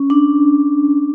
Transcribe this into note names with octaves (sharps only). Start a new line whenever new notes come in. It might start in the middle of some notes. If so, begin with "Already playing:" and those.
Already playing: C#4
D4